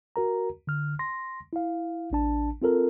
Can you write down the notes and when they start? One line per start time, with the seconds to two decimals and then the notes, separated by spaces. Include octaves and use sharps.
0.16 F#4 A#4 A#5
0.67 D3 F6
0.99 C6 A#6
1.53 E4 F5
2.11 A1 D4 A5
2.62 C4 F4 A4 A#4